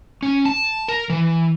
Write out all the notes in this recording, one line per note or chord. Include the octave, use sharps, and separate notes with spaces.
C#4
A5
A#4
E3